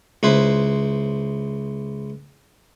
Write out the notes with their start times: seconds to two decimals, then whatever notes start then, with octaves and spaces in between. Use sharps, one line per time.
0.23 C#2 E4 B4 C5